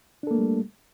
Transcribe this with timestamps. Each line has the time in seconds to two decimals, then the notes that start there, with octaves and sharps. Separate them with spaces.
0.23 D4
0.27 A4
0.31 A#3
0.35 A3
0.38 G3